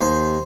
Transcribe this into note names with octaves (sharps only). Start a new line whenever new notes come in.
D#2 C5